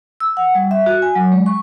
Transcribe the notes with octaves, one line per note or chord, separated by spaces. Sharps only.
E6
F#5
G3
E5
F#4
G#5
F#3
G#3
C#6